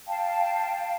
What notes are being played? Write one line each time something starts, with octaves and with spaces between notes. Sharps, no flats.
F5 G5 A5